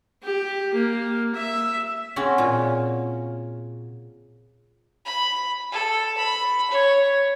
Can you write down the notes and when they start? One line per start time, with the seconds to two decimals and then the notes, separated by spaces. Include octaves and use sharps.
0.23 G4
0.74 A#3
1.35 E5
2.16 C#3 C4 C#4 F#4
2.38 A#2
5.06 B5
5.72 A4
6.17 B5
6.71 C#5